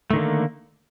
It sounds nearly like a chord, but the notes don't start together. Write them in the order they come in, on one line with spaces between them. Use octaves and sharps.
A3 D#3 D3 A#3